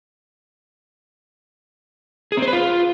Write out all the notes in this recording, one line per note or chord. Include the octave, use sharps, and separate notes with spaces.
G#4
C4
C5
B4
F4